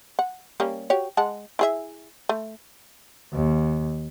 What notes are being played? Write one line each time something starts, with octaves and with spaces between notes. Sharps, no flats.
F#5
G3 A#3 C#4
F#4 G4 C#5
G#3 F#5 A5
E4 G#4 E5
A3
D#2